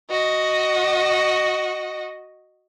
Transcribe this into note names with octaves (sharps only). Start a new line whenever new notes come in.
F#4 D#5